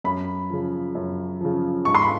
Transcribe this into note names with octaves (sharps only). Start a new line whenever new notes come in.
F#2 B5
C#3 F3
F#2
C#3 F3
G#2 C#6
C6
B5